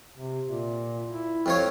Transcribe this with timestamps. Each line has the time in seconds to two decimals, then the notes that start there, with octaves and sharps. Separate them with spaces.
0.16 C3
0.47 A#2
1.11 E4
1.46 F2 F3 C#5